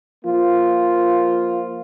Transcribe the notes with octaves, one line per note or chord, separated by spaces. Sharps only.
F3 A#3 F4